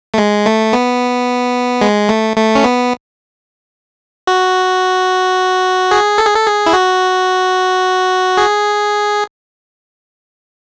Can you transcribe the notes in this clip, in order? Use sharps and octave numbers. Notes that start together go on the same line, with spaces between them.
A3
G#3
A3
B3
G#3
A3
A3
C#4
B3
F#4
G#4
A4
G#4
A4
G#4
E4
F#4
G#4